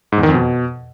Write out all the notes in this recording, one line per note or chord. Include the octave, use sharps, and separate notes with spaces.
G#2
E2
D#3
F2
B2